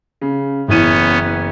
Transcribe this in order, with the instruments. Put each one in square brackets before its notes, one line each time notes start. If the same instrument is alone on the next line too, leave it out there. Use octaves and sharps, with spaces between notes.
[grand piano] C#3
[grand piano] F#1 E3 D#7 [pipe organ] B3 C#4